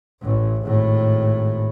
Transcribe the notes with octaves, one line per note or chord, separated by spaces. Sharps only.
A1 A2
G#1 A2